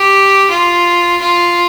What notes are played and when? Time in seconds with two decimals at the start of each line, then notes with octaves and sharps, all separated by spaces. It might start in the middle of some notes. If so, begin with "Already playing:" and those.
Already playing: G4
0.50 F4
1.21 F4